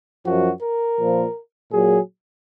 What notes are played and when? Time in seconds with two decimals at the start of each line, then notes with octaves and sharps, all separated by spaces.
0.25 F#2 F3 F#4
0.62 A#4
0.99 A#2 F3
1.72 A#2 F#3 G#4